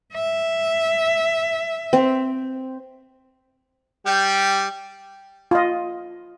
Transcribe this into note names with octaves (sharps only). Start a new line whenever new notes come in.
E5
C4
G3 G4
F4 D#5